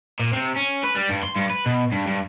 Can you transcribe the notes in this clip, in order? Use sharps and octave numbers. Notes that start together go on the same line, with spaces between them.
A#2
C3
C#4
B4
G3
G2
C6
G2
B4
B2
G2
G2